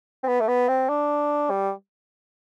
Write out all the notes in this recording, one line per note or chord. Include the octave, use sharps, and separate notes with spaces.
C4
B3
A3
B3
C4
D4
G3